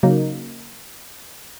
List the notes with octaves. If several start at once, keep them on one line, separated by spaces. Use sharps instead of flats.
C#3 F#3 A#3 D#4